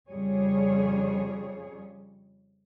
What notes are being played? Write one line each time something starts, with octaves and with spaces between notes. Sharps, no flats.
F2 C#3 G3 G#4 C#5